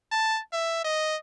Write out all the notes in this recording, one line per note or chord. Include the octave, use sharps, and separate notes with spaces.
A5
E5
D#5